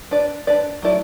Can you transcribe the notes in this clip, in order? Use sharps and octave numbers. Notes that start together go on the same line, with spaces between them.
D4 B4 D5
D4 B4 D5
F#3 A3 E4 D5